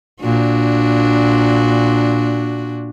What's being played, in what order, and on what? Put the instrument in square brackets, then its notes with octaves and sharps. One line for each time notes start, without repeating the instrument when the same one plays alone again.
[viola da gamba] A#2 D4 F#4